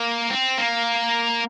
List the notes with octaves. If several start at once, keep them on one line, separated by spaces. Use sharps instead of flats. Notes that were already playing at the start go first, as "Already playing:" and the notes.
Already playing: A#3
C4
A#3